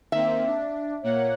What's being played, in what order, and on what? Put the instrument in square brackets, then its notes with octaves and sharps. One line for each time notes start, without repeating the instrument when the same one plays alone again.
[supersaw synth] D#3 A#3 C4 [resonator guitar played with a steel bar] E5
[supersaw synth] D4
[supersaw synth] A#2 A#3 F#5 [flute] C#5